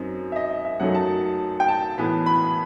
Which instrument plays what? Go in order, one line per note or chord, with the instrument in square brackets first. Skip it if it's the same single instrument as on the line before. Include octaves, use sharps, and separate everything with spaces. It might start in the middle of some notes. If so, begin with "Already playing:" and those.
Already playing: [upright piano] F#2 F#3 C4 D#4
E5
D#5
D#5
E5
F#2 F#3 A3 D#4 F#5
A5
G5
A5
A2 E3 B3
B5